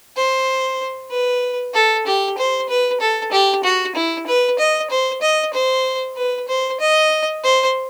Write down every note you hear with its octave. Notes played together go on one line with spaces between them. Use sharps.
C5
B4
A4
G4
C5
B4
A4
G4
F#4
E4
B4
D#5
C5
D#5
C5
B4
C5
D#5
C5